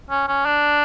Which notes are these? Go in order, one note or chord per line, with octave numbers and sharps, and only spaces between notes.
C#4
C#4
D4